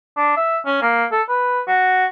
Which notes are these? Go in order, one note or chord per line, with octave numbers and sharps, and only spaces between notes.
D4
E5
C#4
A#3
A4
B4
F#4